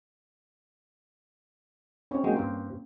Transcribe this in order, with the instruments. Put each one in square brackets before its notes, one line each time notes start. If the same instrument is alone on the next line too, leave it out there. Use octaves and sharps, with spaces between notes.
[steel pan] C4 C#4 C#5
[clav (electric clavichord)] F#3 G#3 [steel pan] A#3 G5
[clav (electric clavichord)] G2 C5